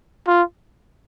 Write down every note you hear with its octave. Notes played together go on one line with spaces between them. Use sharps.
F4